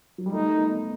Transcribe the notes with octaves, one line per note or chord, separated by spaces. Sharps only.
F#3
G3
A3 D#4
B3